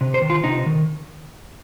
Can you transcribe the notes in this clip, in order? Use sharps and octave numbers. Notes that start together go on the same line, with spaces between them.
C3
C5
D#3
F4
C3 D#4
D#3